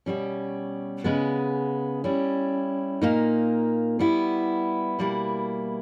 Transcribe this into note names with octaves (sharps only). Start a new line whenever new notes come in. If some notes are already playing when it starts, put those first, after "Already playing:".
B2 G3 C#4
C#3 G#3 B3
G3 C#4 E4
A#2 A#3 D#4
G3 B3 E4
B2 G3 A#3 E4